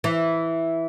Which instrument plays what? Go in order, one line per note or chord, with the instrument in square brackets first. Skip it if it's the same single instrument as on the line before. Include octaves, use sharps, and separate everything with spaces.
[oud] E3